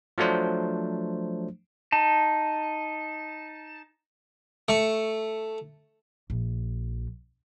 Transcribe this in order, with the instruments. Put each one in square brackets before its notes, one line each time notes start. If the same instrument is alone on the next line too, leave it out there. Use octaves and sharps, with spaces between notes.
[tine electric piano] F3 F#3 A3 D4 C5
[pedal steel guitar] D#4 A5
[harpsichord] A3 C#6
[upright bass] A#1